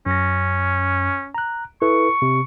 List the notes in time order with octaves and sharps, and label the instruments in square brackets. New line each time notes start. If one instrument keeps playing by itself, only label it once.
[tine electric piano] F#2 A#6 [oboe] C#4
[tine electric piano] A#5 F#6
[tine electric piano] E4 A4 B4 [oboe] C#6
[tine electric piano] C3